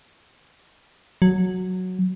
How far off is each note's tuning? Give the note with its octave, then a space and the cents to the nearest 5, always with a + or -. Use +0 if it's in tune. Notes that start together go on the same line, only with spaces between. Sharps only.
F#3 -5